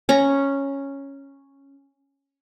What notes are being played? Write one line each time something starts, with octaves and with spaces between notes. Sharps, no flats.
C#4 A#5